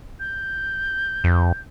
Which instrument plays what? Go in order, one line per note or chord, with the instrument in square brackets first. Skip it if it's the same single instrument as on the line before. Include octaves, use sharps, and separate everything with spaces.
[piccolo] G6
[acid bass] F2